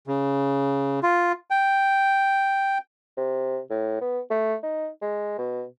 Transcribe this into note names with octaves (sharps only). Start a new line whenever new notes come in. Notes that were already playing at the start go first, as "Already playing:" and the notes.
C#3
F4
G5
C3
A2
B3
A3
D#4
G#3
B2